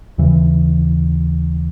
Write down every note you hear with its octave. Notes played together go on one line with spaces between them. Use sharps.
D#2 C#3 E3